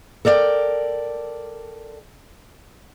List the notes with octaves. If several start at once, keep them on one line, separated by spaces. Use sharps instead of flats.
A4 A#4 D5 F5 G5